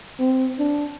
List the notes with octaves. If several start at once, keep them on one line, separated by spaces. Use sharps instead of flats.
C4
D4